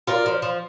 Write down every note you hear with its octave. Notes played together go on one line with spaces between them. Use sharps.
F4 A#4 D5
F3
F3